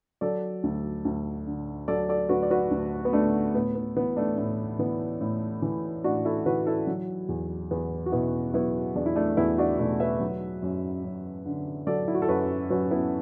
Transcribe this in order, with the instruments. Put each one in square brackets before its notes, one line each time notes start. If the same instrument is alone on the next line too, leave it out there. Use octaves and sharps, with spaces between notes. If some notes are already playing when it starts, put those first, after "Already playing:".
[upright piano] F#3 A4 D5
D2
D2
D3
F#3 A4 D5
A4 D5
D2 F#4 B4
D5
F#4 B4
D2
B3
D3 A3 D4
A2 B3
B3
E3 B3
A3 D4
A2 A3
E3 B3
A2
E3
A2 D4 F#4
E4 A4
E3 F#4 B4
E4 A4
F#3
E2
E2 B3
F#4
B2 B3 E4
F#3 B3 E4
E2 D4
E4
A3 D4
E2 B3 E4
D4 F#4
B2 A3 D4
B4 E5
F#3
F#2
F#2
D3
F#3 A4 D5
E4
F#4
A4
F#2 F#4 B4
F#2 F#4 B4
B3 E4